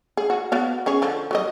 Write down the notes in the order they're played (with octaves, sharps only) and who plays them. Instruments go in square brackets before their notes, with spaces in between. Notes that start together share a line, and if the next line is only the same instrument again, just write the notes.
[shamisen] G#4
F#4
B3 F#4 F5
C#4 G#4 C#5
D3 F3
F#3 G3 D#5